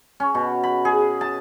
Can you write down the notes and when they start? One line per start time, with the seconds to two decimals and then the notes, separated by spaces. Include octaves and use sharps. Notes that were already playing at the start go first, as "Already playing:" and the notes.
0.20 C#4
0.35 B2
0.63 B5
0.85 G#4
1.21 A5